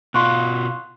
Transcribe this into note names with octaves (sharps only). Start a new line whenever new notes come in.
B2 F4 C6 C#6 F#6